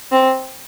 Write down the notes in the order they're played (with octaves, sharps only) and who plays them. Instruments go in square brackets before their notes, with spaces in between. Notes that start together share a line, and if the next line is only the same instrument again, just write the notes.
[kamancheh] C4